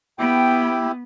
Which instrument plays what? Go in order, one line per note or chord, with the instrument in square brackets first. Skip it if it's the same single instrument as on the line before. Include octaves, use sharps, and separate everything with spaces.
[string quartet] B3 [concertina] E4 G4 [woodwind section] G5